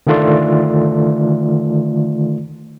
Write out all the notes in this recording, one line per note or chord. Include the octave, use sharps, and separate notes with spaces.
D3 D#3 A3 F4 A4 D5